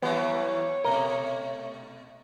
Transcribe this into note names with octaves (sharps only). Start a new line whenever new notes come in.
E3 F#3 G3 B3 C#5
B2 A3 A#4 D#5